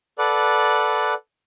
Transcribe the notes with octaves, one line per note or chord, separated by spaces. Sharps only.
A4 B4 D5 F#5